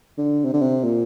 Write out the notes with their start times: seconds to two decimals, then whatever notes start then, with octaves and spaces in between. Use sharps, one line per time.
0.18 D3
0.45 C3
0.53 D3
0.62 C3
0.84 A#2